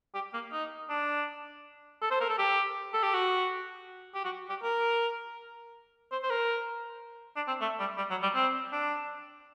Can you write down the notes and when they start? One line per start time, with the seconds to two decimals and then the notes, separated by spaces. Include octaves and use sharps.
0.14 G4
0.34 A#3
0.52 D#4
0.90 D4
2.02 A4
2.11 C5
2.21 A#4
2.29 A4
2.39 G4
2.94 A4
3.03 G4
3.14 F#4
4.15 G4
4.25 F#4
4.50 G4
4.63 A#4
6.12 C5
6.23 C5
6.30 A#4
7.36 D4
7.48 C4
7.61 A3
7.79 G3
7.98 G3
8.11 F#3
8.23 G3
8.35 C4
8.72 D4